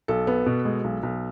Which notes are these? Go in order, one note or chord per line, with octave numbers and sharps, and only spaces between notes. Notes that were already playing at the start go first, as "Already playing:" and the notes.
B1 A4
B3
B2
G#3
B1
B1